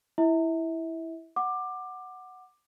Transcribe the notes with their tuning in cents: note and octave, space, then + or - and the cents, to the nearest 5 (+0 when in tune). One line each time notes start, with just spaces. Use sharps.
E4 +0 E5 -30
F#5 +0 D6 +20